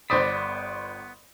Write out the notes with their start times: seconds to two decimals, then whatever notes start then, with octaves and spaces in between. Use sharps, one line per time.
0.10 G1 B3 C5 D5 B5 D#6